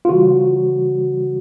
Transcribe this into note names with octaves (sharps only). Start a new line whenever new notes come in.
F4
C#3 E3 G3 F#4